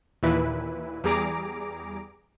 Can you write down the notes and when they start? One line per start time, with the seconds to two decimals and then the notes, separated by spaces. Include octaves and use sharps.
0.23 D#2 A#2 E3 E4 B4
1.04 E2 G3 G#4 A#5 D6 D7